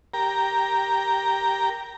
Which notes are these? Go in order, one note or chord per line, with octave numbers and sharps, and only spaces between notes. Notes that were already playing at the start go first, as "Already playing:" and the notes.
G4 A#4 A#5